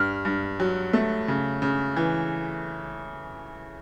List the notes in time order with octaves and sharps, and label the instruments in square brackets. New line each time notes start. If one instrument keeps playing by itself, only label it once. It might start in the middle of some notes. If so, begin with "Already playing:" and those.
Already playing: [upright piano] G2 F6
G2
F#3
A3
C#3
C#3
E3